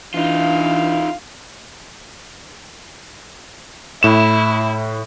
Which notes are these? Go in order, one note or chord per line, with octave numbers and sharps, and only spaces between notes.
E3 D4 D#4 F4 F5
A2 E4 E7